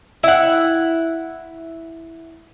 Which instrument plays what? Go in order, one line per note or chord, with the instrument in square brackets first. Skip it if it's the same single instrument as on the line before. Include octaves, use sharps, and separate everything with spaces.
[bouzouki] E4 F#5